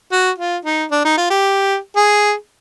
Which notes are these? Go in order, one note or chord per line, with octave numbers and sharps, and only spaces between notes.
F#4
F4
D#4
D4
D#4
F4
G4
G#4